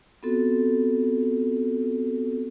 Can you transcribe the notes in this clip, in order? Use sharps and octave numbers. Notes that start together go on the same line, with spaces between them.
B3 C4 F4 F#4 A4